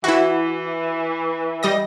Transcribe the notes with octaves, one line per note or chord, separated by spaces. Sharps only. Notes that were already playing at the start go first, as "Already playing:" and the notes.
E3 E4 F#4
G3 D#5 A#6